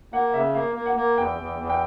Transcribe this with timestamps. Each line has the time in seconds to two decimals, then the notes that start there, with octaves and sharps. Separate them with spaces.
0.13 A#3 F#5
0.34 C#3 E5
0.55 A#3 F5
0.75 A#3
0.86 F#5
0.96 A#3
1.18 E2 G5
1.38 E2
1.59 E2
1.70 G5